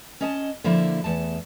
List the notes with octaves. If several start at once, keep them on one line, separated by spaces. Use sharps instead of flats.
C#4 D#5 A5
D3 F3 A#3 E4
E2 A3 A5